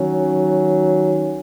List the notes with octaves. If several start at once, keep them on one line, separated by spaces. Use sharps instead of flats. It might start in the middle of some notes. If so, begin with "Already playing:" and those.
Already playing: D#3 F#3 C#4